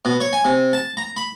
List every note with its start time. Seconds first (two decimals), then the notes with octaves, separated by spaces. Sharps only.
0.05 B2
0.20 C#5
0.33 G#5
0.45 C3
0.73 A5
0.97 A#5
1.17 B5